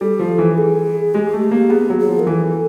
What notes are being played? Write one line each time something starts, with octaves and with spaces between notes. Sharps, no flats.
G3 A4
F3
E3
G#4
G#3 G4
A3
A#3
B3 G#4
F#3
G#4
F3
A#4
E3 A4